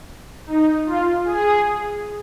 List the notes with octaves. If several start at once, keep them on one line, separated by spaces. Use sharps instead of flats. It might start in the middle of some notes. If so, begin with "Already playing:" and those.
D#4
F4
G#4